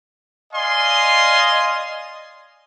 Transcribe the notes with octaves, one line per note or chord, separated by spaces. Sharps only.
D5 D#5 F5 G#5 C6